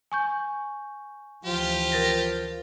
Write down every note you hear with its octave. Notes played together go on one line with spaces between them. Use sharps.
G#5 C#6 G6
D2 E3 F3 F4 G4
A#4 A6 A#6